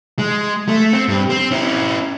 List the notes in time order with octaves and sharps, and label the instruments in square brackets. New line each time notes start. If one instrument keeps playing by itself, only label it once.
[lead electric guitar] G#3
A3
C4
G2
C4
C#4 E4